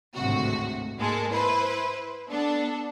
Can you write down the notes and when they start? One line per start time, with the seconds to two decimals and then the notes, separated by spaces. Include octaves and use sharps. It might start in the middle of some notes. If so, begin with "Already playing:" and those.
0.15 G#1 D2 A2 C3 F#4
0.98 G#2 G#3 A#3 A4
1.31 E4 B4 C5
2.30 B3 D4 A4